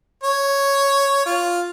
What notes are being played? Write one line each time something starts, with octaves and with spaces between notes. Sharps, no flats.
C#5
F4